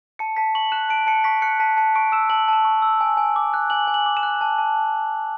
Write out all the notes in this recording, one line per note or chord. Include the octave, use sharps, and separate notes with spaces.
A5 C#7
A5 B6
C#6 F#7
F#6 E7
A5 D7
A5 C#7
C#6 B6
F#6 C#7
A5 B6
A5 C#7
C#6 D7
E6 E7
A5 F#7
A5 E7
C#6
E6
G#5
G#5
D6
F#6
G#5 F#7
G#5
F#7
D6
E7
F#6
A5
A5